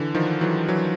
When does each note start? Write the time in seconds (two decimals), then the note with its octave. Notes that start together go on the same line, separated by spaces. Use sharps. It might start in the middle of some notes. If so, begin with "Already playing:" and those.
Already playing: D3 E3
0.15 D#3 F3
0.41 E3 F#3
0.68 E3 F#3